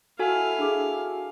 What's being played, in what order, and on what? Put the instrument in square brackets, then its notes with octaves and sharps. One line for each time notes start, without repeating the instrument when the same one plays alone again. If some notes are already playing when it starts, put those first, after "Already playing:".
[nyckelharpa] E4 F5 [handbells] F#4 A4 G#5
[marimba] D4 G#4 D6